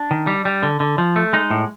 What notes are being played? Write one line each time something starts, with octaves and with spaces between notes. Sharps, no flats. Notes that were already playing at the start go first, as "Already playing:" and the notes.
Already playing: D4
D#3
G3
G3
D3
D3
F3
A3
G#3 D#4
A2